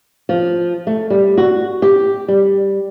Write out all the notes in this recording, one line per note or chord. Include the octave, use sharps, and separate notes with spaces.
F3
A3
G3
F#4
G4
G3